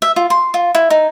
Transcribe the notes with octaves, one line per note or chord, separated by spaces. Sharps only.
E5
F4
C6
F4
E4
D#4